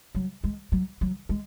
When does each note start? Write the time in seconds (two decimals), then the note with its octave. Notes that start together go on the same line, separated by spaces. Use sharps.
0.15 F#3
0.44 G#3
0.72 F#3
1.01 F#3
1.29 G#3